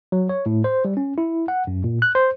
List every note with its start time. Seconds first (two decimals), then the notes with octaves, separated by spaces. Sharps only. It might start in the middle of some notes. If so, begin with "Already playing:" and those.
0.12 F#3
0.29 C#5
0.46 A2
0.64 C5
0.85 G3
0.97 C#4
1.18 E4
1.48 F#5
1.67 F#2
1.84 A#2
2.02 F#6
2.15 C5